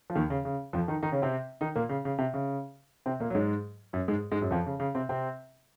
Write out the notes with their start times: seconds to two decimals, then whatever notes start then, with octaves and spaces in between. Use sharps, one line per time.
0.10 F3
0.15 D#2 D#3
0.30 C#3
0.45 C#3
0.73 F2 F3
0.88 D#3 D#4
1.03 D#3 D#4
1.12 C#3 C#4
1.22 C3 C4
1.61 D#3 D#4
1.75 A#2 A#3
1.89 C#3
2.05 C#3
2.18 C3
2.34 C#3
3.06 C3 C4
3.20 A#2 A#3
3.30 F#3
3.35 G#2 G#3
3.93 F#2 F#3
4.08 G#2 G#3
4.31 G#2 G#3
4.42 F#2 F#3
4.51 F2 F3
4.66 C#3
4.80 C#3
4.95 C3 C4
5.09 C3 C4